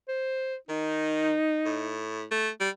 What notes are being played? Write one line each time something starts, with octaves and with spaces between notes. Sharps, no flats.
C5
D#3 D#4
A2
A3
G3